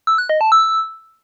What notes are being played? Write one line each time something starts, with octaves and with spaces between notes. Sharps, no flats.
E6
F#6
D#5
A5
E6